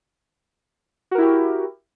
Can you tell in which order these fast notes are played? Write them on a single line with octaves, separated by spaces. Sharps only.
F#4 A#4 E4 G4